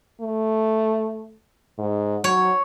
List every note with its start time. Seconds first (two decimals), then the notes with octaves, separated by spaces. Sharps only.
0.21 A3
1.79 G#2
2.24 F#3 C#5